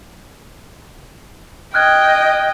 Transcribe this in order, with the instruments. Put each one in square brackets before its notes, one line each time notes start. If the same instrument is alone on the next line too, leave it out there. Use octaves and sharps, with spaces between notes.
[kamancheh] D#5 G5 [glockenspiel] F6 F#6 G#6